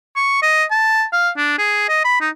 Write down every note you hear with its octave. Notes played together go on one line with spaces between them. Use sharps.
C#6
D#5
A5
F5
D4
G#4
D#5
B5
D#4